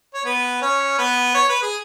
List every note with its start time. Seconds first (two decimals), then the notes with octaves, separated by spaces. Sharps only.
0.14 C#5
0.25 B3 B4
0.61 C#4 C#5
0.98 B3 B4
1.35 C#5
1.49 B4
1.62 G#4